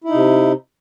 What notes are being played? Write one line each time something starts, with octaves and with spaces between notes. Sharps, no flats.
C3 D#4 E4